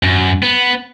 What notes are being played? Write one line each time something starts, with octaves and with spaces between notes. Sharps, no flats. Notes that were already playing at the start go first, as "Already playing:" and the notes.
F#2
B3